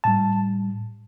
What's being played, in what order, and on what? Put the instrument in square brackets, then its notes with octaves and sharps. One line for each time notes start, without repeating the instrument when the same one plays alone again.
[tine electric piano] A2 G3 A5